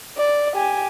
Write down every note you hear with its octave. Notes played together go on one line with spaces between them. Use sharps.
D5
G4 G#5